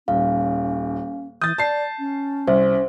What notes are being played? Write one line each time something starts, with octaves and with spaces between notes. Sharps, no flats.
D#1 C#4 F5
E3 D#6 G6 A6
D5 A5 C7
C#4
C2 C5